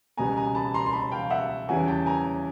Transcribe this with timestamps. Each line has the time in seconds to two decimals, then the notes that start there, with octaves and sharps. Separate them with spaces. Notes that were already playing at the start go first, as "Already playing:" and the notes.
0.17 C#2 B2 G3 B3 G#5 A#5
0.36 G#5 A#5
0.55 A5 B5
0.74 A#5 C6
0.86 C6
0.93 A5 B5
1.12 F5 G5
1.30 E5 F#5
1.69 E2 C#3 E3 G3 F#5 G#5
1.88 G5 A5
2.06 G#5 A#5